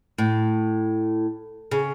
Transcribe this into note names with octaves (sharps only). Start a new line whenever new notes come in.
A2
C#3